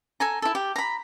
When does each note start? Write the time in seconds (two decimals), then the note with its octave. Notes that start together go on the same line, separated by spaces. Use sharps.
0.20 A4 G#5 A#5
0.42 E4 A4
0.55 G4
0.76 A#5 B5